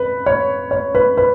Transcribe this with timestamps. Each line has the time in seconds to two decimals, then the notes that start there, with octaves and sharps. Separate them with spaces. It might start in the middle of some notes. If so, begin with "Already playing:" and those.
Already playing: B4
0.26 C#5
0.71 C#5
0.95 B4
1.17 B4